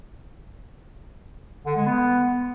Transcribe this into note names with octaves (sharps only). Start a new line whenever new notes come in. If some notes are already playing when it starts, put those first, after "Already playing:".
D3
G#3
B3